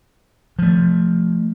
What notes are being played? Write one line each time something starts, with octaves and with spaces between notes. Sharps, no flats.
F3 A3